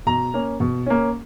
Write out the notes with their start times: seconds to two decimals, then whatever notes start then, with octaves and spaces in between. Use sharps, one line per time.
0.07 B2 A#5
0.34 A#3 C#4
0.60 B2
0.86 A#3 C#4